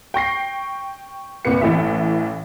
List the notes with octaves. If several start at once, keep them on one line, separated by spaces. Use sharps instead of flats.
G5 C#6 A#6 C7
G1 C2 A#2 B4 C#7
A1 A2 E3 E4 E5